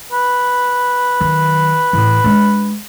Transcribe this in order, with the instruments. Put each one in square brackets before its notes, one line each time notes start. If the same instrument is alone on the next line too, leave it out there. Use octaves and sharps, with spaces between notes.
[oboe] B4
[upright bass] D#3 F#3
A2 E3
G#3 D4